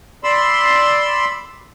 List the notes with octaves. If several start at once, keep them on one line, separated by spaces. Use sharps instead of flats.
D5 B5 C6 E6